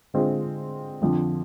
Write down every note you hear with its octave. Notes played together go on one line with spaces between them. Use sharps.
D3 G#3 C4 F4
F2 D3 F3